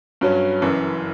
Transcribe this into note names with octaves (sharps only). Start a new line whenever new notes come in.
G2 F#3 C#4
F#1 F#2 E3